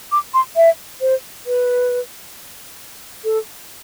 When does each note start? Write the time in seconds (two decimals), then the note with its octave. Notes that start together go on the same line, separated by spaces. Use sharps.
0.12 D6
0.34 C6
0.56 E5
1.01 C5
1.46 B4
3.24 A4